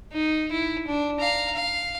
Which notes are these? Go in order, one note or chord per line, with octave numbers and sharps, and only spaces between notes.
D#4
E4
D4
F5 A#5
F5